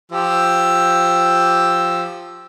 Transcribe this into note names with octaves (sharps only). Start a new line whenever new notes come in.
F3 G4 E6